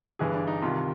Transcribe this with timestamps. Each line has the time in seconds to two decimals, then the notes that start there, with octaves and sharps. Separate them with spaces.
0.19 G1 G2 E3 G#4
0.34 D4
0.47 D#4
0.62 C2 C3 D#3 F4